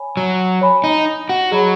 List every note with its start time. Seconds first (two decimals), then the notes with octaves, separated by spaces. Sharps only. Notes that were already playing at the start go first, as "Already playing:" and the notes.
Already playing: C#5 G#5 B5
0.17 F#3
0.61 C#5 G#5 B5
0.84 D#4
1.29 F#4
1.51 F#3 G#4 D#5 B5